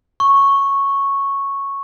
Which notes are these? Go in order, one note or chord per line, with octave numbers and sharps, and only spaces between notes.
C#6